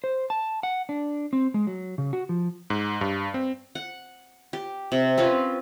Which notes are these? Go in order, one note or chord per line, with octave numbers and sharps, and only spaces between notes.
C5
A5
F#5
D4
C4
G#3
F#3
C#3
F#4
F3
G#2
G2
C4
F#5
G4
C3
C4 C#4 F4 B4